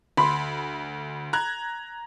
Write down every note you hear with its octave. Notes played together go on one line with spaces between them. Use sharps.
D2 B5 C6
A#5 F#6 G#6